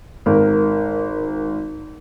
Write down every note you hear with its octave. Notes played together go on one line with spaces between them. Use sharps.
G#1 A#4